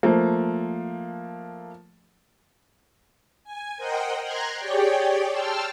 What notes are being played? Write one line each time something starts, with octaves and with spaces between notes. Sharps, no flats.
F3 A3 A#3
G#5
A#4 C5 D#5 F#5 G5
A#5 C6 F#6 G#6 A#6
G4 G#4 C#5 D5 G5
G5 A5 C6 E6 F6